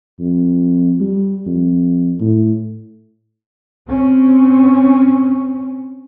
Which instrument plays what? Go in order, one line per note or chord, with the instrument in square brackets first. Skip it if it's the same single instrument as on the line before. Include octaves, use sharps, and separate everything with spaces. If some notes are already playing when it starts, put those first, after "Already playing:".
[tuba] F2
G3
F2
A2
[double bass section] C4 C#4